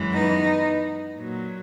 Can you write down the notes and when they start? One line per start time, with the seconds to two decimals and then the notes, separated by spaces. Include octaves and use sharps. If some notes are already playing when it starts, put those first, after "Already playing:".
Already playing: F#2 E3 G#3
0.12 B3 D#4
1.17 A#2 F#3